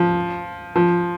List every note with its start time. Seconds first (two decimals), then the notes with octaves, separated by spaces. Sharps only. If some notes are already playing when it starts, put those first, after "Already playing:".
Already playing: F3
0.76 F3